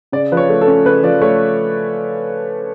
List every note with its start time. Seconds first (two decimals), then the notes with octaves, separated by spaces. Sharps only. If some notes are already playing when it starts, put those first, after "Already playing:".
0.12 C#3 D5
0.32 F3 B4
0.37 C#5
0.49 A3
0.61 A4
0.67 C#4
0.86 C#3 B4
1.03 F3 D5
1.21 A3 C#5